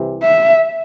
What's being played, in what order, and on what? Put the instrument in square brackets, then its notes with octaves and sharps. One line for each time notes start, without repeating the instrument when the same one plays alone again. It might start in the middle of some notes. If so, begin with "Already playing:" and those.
Already playing: [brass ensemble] C2 C3 E3
[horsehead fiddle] E5